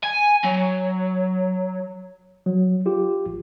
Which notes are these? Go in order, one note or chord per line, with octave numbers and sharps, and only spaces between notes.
G#5
F#3
F#3
F4 G4
A1